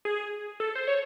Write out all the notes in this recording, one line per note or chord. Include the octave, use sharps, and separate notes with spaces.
G#4
A4
C5
C#5